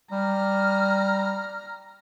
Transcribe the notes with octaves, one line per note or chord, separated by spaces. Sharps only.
G3 A#5 F6